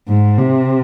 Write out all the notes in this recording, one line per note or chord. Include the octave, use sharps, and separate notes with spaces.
G#2
C3